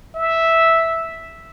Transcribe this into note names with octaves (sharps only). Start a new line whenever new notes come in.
E5